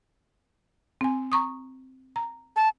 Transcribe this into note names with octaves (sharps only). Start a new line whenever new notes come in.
C4 G#5
A#5 C#6 D#6
A#5
A5